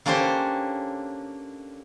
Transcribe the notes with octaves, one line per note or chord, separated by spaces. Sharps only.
D3 A#3 C#4 D4 G4 C5